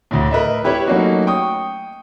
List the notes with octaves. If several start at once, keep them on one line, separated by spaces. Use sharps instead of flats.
D2 A2
A#4 B4 D#5 E5
E4 G4 B4 C#5
F#3 A3 A#3 C#4 D#4 F#4
G5 C#6 D#6